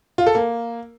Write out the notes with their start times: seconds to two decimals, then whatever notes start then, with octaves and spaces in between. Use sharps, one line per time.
0.18 F4
0.26 A4
0.35 A#3